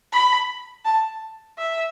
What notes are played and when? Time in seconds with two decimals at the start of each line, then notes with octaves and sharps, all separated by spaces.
0.13 B5
0.85 A5
1.58 E5